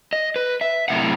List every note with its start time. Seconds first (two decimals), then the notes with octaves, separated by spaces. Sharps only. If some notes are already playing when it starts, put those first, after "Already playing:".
0.13 D#5
0.36 B4
0.61 E5
0.88 F#2 A2 C3 F#5